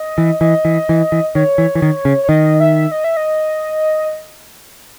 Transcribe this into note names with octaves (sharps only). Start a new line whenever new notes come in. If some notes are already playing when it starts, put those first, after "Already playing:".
Already playing: D#5
E3
E3 D#5
E3
E3
E3
D#3 C#5
E3
E3
D#3
C#3
C#5
D#3 D#5
E5
D#5
E5
D#5